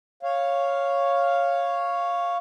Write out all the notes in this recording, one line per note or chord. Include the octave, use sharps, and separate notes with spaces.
C#5 F5